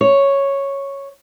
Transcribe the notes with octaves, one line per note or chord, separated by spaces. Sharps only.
C#5